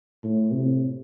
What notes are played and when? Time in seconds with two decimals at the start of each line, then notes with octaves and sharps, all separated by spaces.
0.24 A2
0.51 C3